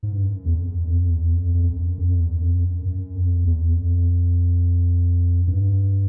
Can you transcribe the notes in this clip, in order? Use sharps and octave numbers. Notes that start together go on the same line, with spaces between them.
G#2
G2
F#2
E2
F2
E2
F#2
F2
E2
F2
F2
F2
F#2
F2
E2
F#2
F2
F#2
F#2
F2
E2
F2
F#2
G2